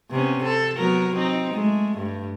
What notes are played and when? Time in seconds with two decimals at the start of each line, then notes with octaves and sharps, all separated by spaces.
0.11 C3 B3 C#4
0.43 C4 A4
0.77 F#3 B3 A#4
1.15 C4 D#4
1.52 G#3 A3
1.97 G2